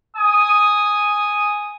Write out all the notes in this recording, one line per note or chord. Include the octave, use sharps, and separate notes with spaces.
G#5 D#6